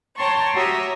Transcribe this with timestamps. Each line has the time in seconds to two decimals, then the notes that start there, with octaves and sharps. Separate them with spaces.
0.17 C#5 G5 A5 A#5 C6 C#6
0.54 F#4 G4 C#5 E5 A#5 D#6